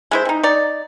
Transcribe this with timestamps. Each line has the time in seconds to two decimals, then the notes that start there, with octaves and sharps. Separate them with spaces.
0.11 G#3 E4 C5
0.25 C4 D#4
0.43 D#4 D5